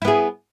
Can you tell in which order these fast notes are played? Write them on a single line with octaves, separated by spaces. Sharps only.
E4 B3 G#4